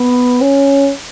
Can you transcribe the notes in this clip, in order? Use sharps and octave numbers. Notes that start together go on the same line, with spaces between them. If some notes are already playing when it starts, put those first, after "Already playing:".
Already playing: B3
C#4